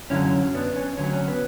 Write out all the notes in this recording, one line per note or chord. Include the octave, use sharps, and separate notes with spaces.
F#2 D3 F#3 C#4 E4
B3 D4
C#4
D2 D3 F#3 C#4
C#4
B3